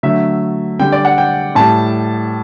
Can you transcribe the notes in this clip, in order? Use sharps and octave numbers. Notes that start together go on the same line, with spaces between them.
D3 F#3 A3 E5
D3 G3 G5
D5
F#5
G5
A2 G3 A5